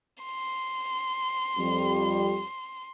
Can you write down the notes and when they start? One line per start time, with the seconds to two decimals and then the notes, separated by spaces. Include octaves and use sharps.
0.24 C6
1.57 F2 G3